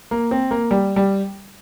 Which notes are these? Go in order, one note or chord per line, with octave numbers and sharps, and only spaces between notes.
A#3
C4
A#3
G3
G3